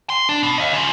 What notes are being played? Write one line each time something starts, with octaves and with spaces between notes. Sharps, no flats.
C6
D4
B2
D#5 F5
C#3 F3